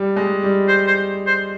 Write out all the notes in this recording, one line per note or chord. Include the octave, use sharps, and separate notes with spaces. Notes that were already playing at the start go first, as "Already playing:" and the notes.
Already playing: G3
G#3
G3
C5
C5
C5